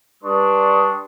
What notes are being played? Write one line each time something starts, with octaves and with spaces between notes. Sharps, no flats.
G3 D4 B4 C6 C#6 D#6